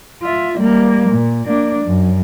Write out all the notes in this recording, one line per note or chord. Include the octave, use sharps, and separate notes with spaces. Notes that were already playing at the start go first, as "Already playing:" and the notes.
F4 E5
G3 A#3
A#2
A#3 D4
F#2